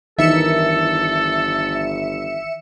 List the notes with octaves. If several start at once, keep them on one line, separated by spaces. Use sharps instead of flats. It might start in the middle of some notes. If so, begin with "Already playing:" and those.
G1 D#3 E3 D#4 A4 E5 C#7 E7